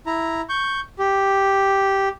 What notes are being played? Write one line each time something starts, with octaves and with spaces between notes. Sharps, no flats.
E4 A#5
C#6 G6
G4